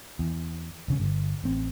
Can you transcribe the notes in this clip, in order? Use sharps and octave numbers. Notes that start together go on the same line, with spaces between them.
E2
E1 C#3 C#4
G1
A1 C4